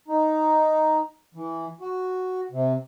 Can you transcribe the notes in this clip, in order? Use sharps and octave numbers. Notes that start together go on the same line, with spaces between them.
D#4
E3
F#4
C3